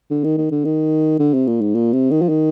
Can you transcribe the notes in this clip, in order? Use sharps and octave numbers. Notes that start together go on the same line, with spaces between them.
D3
D#3
D#3
D3
D#3
D3
C3
A#2
G#2
A#2
C3
D#3
F3
D#3